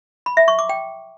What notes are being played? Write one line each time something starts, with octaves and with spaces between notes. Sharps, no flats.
B5
E5
C#6
D6
G5